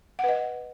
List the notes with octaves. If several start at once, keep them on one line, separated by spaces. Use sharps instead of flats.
B4 D#5 F#5